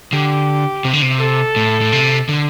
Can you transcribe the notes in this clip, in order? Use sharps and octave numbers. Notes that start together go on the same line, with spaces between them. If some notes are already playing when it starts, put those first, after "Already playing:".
D3 G4
C3
D3
C3
A4
A2
A2
C3
D3